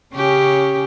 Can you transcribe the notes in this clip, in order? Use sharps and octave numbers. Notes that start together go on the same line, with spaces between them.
C#3 C#4 G4